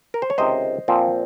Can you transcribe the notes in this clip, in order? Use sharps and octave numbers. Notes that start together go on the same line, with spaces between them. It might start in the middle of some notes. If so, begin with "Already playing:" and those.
A#4
C5
C#5
C#2 C3 D#3 C5 D#5
A#2 F3 C4